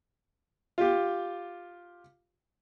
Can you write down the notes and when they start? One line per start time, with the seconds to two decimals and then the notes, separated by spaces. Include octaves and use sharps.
0.78 F4 G4